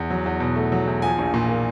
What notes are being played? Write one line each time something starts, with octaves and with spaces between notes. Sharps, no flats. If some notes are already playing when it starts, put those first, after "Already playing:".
Already playing: E2
F#3
E2
B2
A3
F#3
E2
F3 G#5
A#1
A#2
A#3